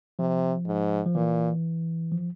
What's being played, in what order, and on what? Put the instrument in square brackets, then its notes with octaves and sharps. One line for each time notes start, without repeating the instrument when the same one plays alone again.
[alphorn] C3 [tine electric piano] F3
[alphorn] G#2
[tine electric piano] F3
[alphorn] A#2 [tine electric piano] E3
[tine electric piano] F3